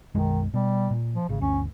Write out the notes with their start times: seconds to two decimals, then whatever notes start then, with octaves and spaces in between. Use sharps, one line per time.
0.15 B1 F#2 D#3 G#3
0.54 B2 G3
0.91 A#2
1.14 F3
1.29 G#1 C#3
1.41 G1 D2 C#4